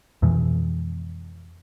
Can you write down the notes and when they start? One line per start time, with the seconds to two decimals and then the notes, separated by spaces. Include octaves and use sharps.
0.22 F2 B2 E3 G#3